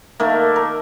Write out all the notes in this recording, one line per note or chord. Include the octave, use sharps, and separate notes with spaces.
D#3 A3 A#3
A#4